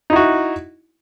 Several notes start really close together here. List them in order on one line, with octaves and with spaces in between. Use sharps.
D#4 E4 F#4